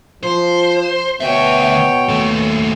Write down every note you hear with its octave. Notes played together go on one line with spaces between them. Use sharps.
F3 C5
D2 B2 C#5 E5 G5
D#2 A3